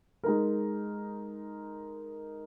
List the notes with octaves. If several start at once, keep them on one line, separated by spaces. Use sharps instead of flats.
G#3 D#4 A#4